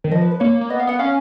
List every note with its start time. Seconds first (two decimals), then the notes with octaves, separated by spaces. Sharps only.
0.04 D#3
0.11 F3 D#5
0.21 B4
0.31 B4
0.40 A#3 C#5
0.61 A#3
0.69 B3 D#5
0.79 F5
0.87 B3 F#5
0.99 C#4 F5